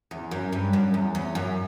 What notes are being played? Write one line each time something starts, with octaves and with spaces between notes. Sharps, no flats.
E2
F#2
G2
F#2
E2
E2
F#2